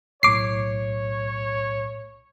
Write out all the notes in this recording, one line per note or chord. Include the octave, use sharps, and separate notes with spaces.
B1 A2 C#5 D6 C7